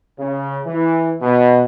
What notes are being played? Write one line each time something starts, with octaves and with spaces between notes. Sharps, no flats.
C#3
E3
B2